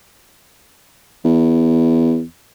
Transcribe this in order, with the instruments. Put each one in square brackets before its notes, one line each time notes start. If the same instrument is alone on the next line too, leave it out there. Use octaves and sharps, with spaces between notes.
[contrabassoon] E2